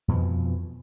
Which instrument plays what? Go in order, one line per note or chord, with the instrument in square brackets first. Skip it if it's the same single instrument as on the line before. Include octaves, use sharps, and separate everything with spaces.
[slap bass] F2 B2 E3 F3